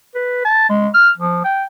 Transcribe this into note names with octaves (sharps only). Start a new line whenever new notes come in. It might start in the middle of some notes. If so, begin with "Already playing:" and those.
B4
A5
G#3
F6
F3
G5